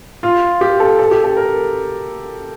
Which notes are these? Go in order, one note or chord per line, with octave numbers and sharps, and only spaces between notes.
F4
G4
A4
A4
G4
A4
A#4